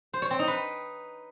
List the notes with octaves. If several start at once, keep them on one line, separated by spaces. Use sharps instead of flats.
C5
C#5
C4
D#4
B4